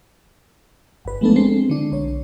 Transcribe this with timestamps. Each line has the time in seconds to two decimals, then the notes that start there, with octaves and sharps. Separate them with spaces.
1.05 G1 B4
1.21 F3 G#3 A3 B3 D4 A4
1.36 G#3 C4 C7
1.70 D3 D4
1.92 B1 C#5